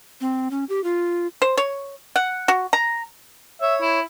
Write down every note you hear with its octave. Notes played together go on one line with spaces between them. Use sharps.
C4
C#4
G4
F4
C5
C#5
F#5
F#4
A#5
C#5 E5
E4